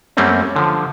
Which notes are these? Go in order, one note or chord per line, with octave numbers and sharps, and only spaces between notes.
F#2 G3 A3 A#3 C4 C#4
D3 F3